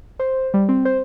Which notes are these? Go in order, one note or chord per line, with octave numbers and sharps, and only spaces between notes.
C5
G3
C4
C5